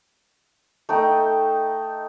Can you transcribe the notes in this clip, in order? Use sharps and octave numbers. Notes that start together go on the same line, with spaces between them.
A3 D#4 G5